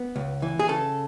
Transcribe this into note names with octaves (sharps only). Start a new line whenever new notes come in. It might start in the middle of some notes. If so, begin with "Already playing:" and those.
Already playing: B3
C#2
E3
G#4
C#3 A4